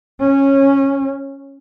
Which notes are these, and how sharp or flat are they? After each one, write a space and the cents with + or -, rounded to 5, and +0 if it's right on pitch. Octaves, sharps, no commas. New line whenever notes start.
C#4 -15